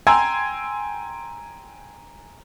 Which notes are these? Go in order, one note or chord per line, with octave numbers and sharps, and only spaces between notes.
G5 G#5 A#5 C6 E6 G#6